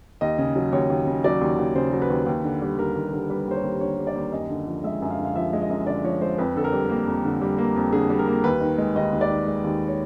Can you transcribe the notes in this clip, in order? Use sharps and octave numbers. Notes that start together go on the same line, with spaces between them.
D#2 D#5
C#3
F#3
D#2 C#5
D#2
C#3
F#3 D5
D#2
D#2
C#3 C5
F#3
B4
D#2
D#2
D3
G3
D#2 A#4
D#2
D3
G3 B4
D#2 C5
C#5
D#2
D3 C#5
G3
D5
D#2
F#2 D#5
D3
F3
G#3 E5
F#2
F5
D3
F5
F3 E5
G#3
D#5
F#2
D3 D5
F3 C#5
G#3 C5
F2 B4
D3 A4
A#4
G3
A#3
F2
D3
G3
A#3
F2
D3 G#4
G3
A#4
A#3
D#2 B4
D#3
G#3
D#2 D#5
D#2
D5
D#3
G#3
D#2
C#5